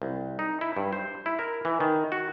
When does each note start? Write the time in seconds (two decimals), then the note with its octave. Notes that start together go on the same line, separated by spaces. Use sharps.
0.02 C2
0.39 D#4
0.61 E4
0.77 G2
0.93 C5
1.26 E4
1.39 A#4
1.65 E3
1.80 D#3
2.12 F#4